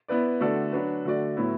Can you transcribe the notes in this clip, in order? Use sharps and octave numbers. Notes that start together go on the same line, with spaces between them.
B3 E4 B4 D5
D3 A3 F#4 A4 D5
F#3 D4 F#4 B4
D3 A3 F#4 D5
A2 F#3 B3 E4